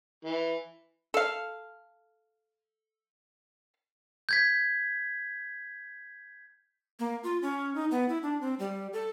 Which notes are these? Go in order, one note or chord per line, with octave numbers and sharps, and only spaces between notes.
E3
A4 F5
G6 G#6 B6
A#3
F4
C#4
D#4
B3
E4
D4
C4
G3
A4